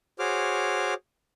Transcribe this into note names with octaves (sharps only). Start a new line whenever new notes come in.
F#4 G#4 C5 C#5 D6 F6